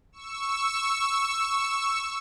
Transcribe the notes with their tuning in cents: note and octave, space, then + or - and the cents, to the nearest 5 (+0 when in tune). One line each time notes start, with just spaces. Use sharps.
C#6 +0 E6 +0